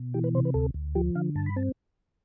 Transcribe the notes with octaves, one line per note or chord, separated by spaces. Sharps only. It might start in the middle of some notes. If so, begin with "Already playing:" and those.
Already playing: B2
E3 G4
B4
C3 C5
B4
D2 A4
D2
F3 G4
D3 F5
G2 A5
B5
C4 A5